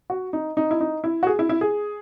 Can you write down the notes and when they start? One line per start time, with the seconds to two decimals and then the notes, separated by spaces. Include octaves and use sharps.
0.10 F#4
0.33 D#4
0.57 D#4
0.71 E4
0.81 D#4
1.04 E4
1.23 F#4
1.27 G#4
1.39 E4
1.49 E4
1.61 G#4